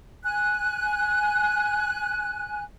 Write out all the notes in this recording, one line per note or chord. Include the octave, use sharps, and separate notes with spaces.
G#5 F#6